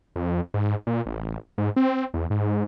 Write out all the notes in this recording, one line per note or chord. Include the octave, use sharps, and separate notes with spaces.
F2
G#2
A#2
A1
G#2
C4
E2
G#2